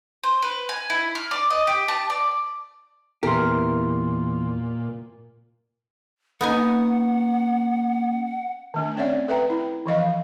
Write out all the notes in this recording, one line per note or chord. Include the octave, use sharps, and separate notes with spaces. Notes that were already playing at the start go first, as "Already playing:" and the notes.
C5
B4
G#5
E4
F6
D5
D#5
G4
A5
D5
E2 A#2 E3 G4 A#4 C6
A#3 B3 C#4 D#4 F#5 G#5
D#3 A3 D4
C4 C#4 C#5 D5 E5 F#5
A4 B4 E5 G5 A#5
E4
E3 F3 D#5 F5